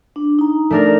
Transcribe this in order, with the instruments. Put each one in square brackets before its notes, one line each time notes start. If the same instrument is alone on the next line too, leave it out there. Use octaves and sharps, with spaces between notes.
[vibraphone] D4
D#4 A#5
[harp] A3 D4 A#4